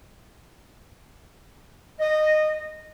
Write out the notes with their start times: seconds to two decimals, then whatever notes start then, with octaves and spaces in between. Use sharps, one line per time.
2.00 D#5